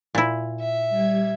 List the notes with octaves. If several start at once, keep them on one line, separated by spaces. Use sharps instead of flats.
A#2 E4
E5
G3 G#6